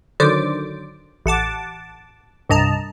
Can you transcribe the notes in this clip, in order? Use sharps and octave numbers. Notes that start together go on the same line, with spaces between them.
D3 D#3 F#3 C5 D5 D6
A1 F#5 A5 D6
C2 G2 D#5 A5 A#5